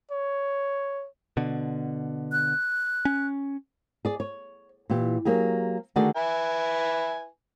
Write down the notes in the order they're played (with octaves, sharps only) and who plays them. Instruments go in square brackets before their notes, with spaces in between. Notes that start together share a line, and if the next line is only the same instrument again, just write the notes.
[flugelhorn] C#5
[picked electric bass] B2 D3
[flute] F#6
[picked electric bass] C#4
[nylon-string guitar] G#4 D5
C#5
A#2 E3 G4
F#3 A#3 G4 G#4
D3 D#3 A3 F#4 G#4 D5
[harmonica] E4 B4 G#5